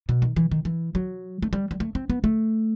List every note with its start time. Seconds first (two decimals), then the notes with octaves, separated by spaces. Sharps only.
0.09 B2
0.22 D#3
0.36 E3
0.51 D#3
0.65 E3
0.95 F#3
1.42 A3
1.53 G3
1.71 G3
1.80 A3
1.95 C4
2.10 B3
2.24 A3